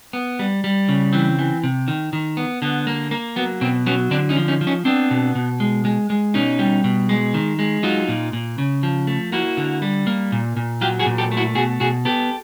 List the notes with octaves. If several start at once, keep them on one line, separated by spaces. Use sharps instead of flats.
B3
G3
G3
C#3
E3 C4
E3
C3
D#3
D#3
B3
D3 B3
A#3
A#3
F#3 B3
B2 C4
F#3 B3 C#4
D3 C4 D4
C#4 D#4
F3
C#4 D#4
F3
C#4 D#4
B3 C4 D4
B2
B2
G#3
G#3
G#3
B2 C#4 D#4
G3
B2
G#3
D#3
G#3
F#3 D#4 F4
A#2
A#2
C#3
F3
A3
A#3 E4 F#4
D3
G3
A#3
A#2
A#2
F#3 F4 G4
F#4 G#4
A#2
G4 A4
A3
E4 F#4
B2 F#4 G#4
B2 F#4 G#4
B3 G4 A4